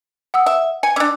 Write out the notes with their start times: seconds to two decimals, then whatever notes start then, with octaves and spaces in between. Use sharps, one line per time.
0.34 F#5 D#6 E6
0.46 E5
0.83 G#5 C#7
0.96 C#4 D4 D6 E6